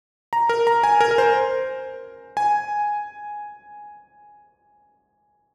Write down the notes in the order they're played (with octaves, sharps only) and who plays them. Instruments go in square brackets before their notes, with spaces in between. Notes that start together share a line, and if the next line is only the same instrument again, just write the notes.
[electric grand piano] A#5
A#4
A#5
G#5
A#4
A#4
C5
G#5